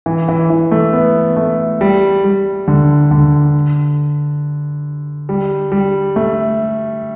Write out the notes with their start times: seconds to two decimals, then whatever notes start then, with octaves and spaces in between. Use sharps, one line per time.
0.06 E3
0.29 E3
0.50 E3
0.71 A3
0.93 B3
1.37 A3
1.81 G3
2.24 G3
2.68 D3
3.11 D3
5.29 G3
5.72 G3
6.16 A3